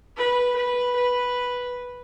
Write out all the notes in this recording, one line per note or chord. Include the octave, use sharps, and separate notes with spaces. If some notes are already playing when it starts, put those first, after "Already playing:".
B4
B4
B4